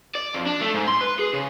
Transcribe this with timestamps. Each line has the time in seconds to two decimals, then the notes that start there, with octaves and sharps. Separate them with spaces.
0.15 D5
0.35 F2
0.47 D4
0.61 A3
0.74 G#2
0.88 C6
1.01 B4
1.19 G#4
1.33 C#3